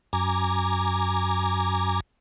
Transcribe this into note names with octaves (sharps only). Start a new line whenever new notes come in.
F#2 G#5 A#5 D6